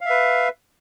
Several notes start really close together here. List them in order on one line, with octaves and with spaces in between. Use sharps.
F5 E5 B4